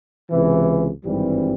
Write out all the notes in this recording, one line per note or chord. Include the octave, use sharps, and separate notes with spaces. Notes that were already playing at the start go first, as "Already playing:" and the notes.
C#2 C3 E3
G#1 G2 E3 G3 C4